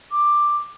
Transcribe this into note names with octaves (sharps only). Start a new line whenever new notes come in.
D6